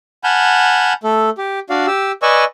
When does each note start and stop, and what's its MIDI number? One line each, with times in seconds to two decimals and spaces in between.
0.24 0.93 78
0.24 0.93 80
0.24 0.93 81
0.24 0.93 83
0.24 0.93 89
0.24 0.93 91
1.04 1.30 57
1.04 1.30 69
1.38 1.60 67
1.70 1.86 62
1.70 1.86 66
1.70 1.86 74
1.70 1.86 77
1.87 2.12 67
1.87 2.12 88
2.22 2.44 71
2.22 2.44 74
2.22 2.44 75
2.22 2.44 80
2.22 2.44 85
2.22 2.44 88